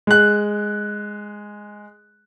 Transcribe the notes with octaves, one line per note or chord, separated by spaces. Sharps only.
G#3 F#6